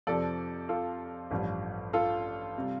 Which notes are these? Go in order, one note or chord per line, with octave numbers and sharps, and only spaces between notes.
F2 C3 F3 A4 D5
F4 A4
A1 G2 F3
F4 A4
C3 G3